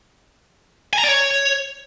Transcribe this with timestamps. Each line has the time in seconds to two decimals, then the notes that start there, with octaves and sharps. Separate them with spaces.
0.93 G#5
0.98 A#5
1.04 D5
1.09 C#5